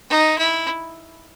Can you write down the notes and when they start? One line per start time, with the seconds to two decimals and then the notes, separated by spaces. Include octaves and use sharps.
0.10 D#4
0.38 E4